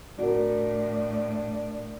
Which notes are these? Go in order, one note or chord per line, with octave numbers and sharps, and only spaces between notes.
A2 D4 F#4 A#4